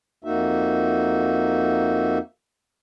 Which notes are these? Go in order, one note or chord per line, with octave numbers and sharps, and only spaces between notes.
F2 A#3 D#4 F#4 E5